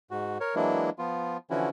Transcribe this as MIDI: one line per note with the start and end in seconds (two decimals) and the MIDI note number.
0.11 0.38 44
0.11 0.38 66
0.40 0.55 70
0.40 0.55 73
0.55 0.90 52
0.55 0.90 54
0.55 0.90 56
0.55 0.90 58
0.55 0.90 62
0.55 0.90 64
0.99 1.37 53
0.99 1.37 59
0.99 1.37 65
1.50 1.69 50
1.50 1.69 52
1.50 1.69 53
1.50 1.69 61
1.50 1.69 64
1.50 1.69 66